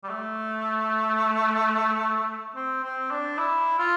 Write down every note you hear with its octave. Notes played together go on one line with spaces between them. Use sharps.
G3
A3
C4
C4
D4
E4
F4